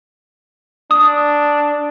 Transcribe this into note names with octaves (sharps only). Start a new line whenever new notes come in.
D4 D#6